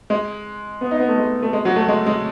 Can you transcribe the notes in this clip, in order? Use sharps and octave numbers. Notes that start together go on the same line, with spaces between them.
G#3
B3
D#4
B3
A3
G#3
A3
G#3
F#3
A3
G#3
G#3